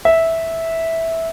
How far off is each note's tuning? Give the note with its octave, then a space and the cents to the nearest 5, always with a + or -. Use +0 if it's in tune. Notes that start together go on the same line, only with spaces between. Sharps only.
E5 -10